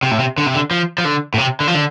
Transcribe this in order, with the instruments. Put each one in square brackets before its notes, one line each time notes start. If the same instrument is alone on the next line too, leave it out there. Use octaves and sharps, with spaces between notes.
[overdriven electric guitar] C3
A2
C3
D3
C3
D3
F3
F3
D3
A2
C3
D3
F3
D3